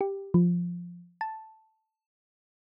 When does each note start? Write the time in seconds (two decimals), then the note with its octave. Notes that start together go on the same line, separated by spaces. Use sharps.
0.01 G4
0.34 F3
1.21 A5